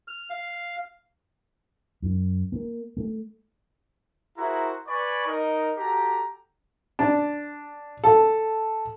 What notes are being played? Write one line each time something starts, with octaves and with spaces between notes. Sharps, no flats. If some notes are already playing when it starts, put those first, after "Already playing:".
F6
F5
F#2
A#3
A3
E4 F#4 G#4 A#4 C5 A#5
B4 D5 G#5 B5 C#6
D#4 A#4 D#5
F#4 G4 A4 A#5
D4
A4